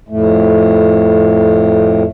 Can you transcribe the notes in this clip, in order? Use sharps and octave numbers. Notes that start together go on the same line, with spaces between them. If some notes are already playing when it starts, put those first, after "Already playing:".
F2 A2 A3